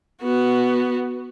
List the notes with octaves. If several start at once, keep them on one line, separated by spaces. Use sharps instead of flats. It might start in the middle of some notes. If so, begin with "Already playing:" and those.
B3 F#4